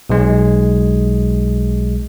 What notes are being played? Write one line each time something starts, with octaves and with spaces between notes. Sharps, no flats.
B1 G#3